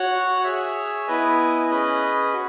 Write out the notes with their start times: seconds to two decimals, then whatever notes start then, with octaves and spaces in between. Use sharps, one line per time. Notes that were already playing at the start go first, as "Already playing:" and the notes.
Already playing: F#4 C#5 F#5
0.44 G#4 C#5 E5
1.07 B3 E4 B4 D#5 G#5
1.70 C#4 G#4 B4 D#5
2.33 F#4